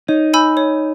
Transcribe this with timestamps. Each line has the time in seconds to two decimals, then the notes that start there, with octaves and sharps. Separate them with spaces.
0.08 D#4 C#5
0.34 G#5 B5 E6 G6
0.57 C#5